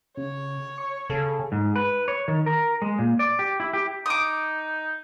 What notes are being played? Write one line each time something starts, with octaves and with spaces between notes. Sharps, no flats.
C#3 C#5
C#6
C#3 A4
G#2
B4
C#5
D#3
A#4
G#3
A#2
D5
G4
E4
G4
D#4 D6 D#6